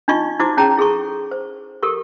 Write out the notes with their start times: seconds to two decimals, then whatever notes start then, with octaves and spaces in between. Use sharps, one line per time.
0.08 D4 D#4 F4 D#5 C#6
0.39 D#4 E4 F#4 C5 D6
0.57 C#4 G#4 C#5 G5 A5 A#5
0.78 E4 G#4 A4 C6 C#6
1.31 C5
1.83 G4 A4 A#4 C#6